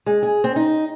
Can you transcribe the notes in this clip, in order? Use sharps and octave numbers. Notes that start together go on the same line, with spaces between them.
G#3
G#4
C4
D#4